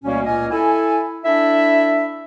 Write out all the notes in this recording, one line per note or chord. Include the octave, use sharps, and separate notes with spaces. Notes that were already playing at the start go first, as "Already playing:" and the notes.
D2 B2 G3 A#3 C#4
C#2 A#2 A#3 C#4 D#5 G#5
E4 A4 G#5
D4 E4 A4 E5